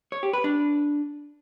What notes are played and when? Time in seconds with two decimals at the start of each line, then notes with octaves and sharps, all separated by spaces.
0.12 C#5
0.23 G4
0.33 B4
0.44 D4